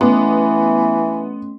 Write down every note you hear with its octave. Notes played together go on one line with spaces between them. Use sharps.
E3 A3 B3 C#4 C6